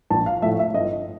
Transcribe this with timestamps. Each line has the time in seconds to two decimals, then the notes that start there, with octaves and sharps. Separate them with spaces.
0.10 A#1 A5
0.26 F5
0.42 A2 F3 A3 E5
0.59 E5
0.74 G1 D#5